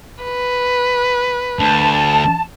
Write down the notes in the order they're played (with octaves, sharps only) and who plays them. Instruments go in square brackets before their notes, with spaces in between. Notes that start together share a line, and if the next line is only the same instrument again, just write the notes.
[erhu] B4
[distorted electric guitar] D2 [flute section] A5